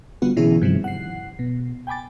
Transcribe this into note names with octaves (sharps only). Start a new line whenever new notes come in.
D3 G3 B3 F4 F#4
B2 D3 E3 C#4 E4 G#4
G2 C3 D#3 F3
F#5 C7
B2
G5 G#5 B5 D6 A6